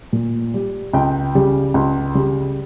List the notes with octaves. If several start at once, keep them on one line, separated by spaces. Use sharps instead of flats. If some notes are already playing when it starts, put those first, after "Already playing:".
A#2
G3
C#2 G5
C#3 G3
C#2
C#3 G3